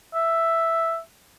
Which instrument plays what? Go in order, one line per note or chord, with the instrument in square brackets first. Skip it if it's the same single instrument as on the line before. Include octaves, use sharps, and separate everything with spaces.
[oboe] E5